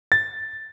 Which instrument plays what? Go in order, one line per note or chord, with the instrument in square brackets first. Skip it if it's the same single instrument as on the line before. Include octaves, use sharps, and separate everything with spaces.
[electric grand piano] A6